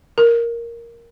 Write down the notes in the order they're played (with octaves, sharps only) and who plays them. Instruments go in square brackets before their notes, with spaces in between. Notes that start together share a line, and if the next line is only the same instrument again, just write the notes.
[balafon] A#4